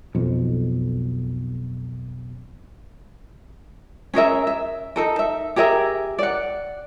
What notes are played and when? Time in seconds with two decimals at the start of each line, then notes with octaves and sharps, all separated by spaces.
0.15 B1 F2
4.14 C#4 G#4 A#4 E5
4.47 E5
4.96 D#4 A4 A#4
5.19 E5
5.56 G4 G#4 A#4 E5
6.18 D5 F#5